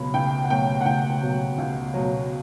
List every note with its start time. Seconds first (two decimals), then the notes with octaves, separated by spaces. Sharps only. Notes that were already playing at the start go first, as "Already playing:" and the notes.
Already playing: C#2 B2 F#3 B5
0.14 C#2 G5
0.44 F#5
0.50 B2 F#3 G5
0.81 F#5
0.86 C#2 G5
1.22 B2 F#3
1.58 C#2
1.94 B2 F#3